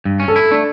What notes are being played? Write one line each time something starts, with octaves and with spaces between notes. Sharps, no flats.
G2
C#4
A4
E4
A3 D4